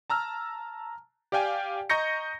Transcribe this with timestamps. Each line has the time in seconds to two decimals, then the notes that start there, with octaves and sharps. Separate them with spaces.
0.10 A5 A#5 E6 F6
1.32 G4 D5 F5 G5 G#5
1.90 D#5 A#5 C#6 G6 A#6 C#7